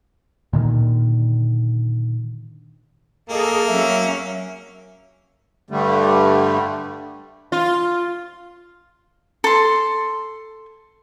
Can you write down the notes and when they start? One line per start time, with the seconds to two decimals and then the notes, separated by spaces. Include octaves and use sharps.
0.53 A#2 D3 D#3
3.29 A#3 G#4 A4 D#5
3.67 F#3 C#4 E5
5.70 G2 D3 G3 A3
7.52 F4
9.44 A4 C6